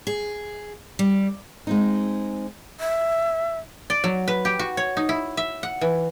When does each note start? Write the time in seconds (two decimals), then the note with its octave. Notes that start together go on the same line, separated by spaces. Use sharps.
0.07 G#4
0.99 G3
1.67 G#3 C4 D#4
2.80 E5
3.90 D5
4.04 F#3
4.28 B4
4.45 G4
4.59 F#4
4.77 C#5
4.97 D#4
5.09 E4
5.37 E5
5.63 F#5
5.81 E3